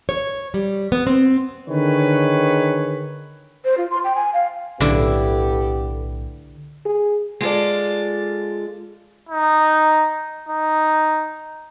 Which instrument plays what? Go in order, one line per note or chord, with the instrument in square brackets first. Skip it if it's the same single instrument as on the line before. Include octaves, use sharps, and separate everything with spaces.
[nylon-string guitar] C#5
G3
B3
C4
[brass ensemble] D3 D#3 G#4 B4 C#5
[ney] C5
F4
C6
G5
G#5
F5
[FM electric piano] B1 A2 [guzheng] D3 E4 [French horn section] B3 G4 A4
[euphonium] G#4
[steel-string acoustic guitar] G#3 F4 A4 D5
[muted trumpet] D#4
D#4